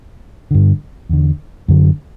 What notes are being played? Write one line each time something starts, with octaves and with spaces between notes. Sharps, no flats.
G2 D3
E2 D3
F#2 D3